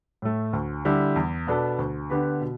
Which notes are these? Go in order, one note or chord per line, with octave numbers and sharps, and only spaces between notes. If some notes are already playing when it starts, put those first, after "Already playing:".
A2 A3
D2
D3 G3 E4
E2
B2 B3 D4 A4
D2
D3 B3 G4 B4
B2